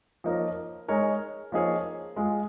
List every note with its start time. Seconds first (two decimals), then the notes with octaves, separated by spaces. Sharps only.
0.24 F3 A#3 D#4 A#4 C#5
0.88 G#3 D#4 A#4 C#5
1.52 F3 A#3 D#4 G#4 C#5
2.16 G#3 F4 G#4